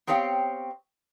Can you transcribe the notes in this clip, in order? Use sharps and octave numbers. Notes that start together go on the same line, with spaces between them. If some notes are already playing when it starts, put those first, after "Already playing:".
B3 C4 G4 C#5 F5 G5